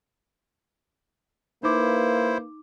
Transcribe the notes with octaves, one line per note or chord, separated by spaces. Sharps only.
A#3 D#4 E4 B4 C5 D6